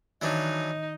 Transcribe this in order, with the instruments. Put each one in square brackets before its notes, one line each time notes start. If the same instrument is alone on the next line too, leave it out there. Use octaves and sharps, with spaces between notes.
[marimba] D#3 [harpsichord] E3 F#3 D4 [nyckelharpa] D#4 [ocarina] D#5